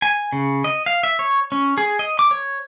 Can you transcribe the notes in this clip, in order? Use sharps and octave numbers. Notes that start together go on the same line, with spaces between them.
G#5
C#3
D#5
F5
E5
C#5
C#4
G#4
D#5
D6
C#5